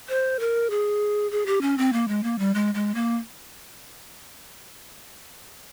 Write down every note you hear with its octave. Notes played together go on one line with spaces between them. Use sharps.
C5
A#4
G#4
G#4
G4
C#4
C4
A#3
G#3
A#3
G3
G#3
G#3
A#3